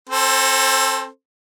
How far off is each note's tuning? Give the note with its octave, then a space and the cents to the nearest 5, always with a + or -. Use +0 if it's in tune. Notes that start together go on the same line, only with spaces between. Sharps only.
C4 +35 A4 +0 C5 +0